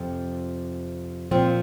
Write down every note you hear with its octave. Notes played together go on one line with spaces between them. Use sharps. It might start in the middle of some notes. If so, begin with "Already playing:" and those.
Already playing: F2 C3 F3 C4
A#2 F3 C4